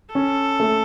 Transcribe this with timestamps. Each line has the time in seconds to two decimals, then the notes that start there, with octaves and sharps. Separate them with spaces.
0.14 C#4 A4
0.60 A3